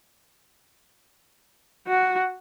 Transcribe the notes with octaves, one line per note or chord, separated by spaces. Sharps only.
F#4